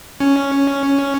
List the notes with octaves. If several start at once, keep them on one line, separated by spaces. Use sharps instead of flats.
C#4